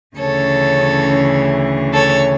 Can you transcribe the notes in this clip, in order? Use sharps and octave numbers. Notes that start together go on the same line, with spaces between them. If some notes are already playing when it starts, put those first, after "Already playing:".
D2 C#3 E3 A4 C#5
A4 C#5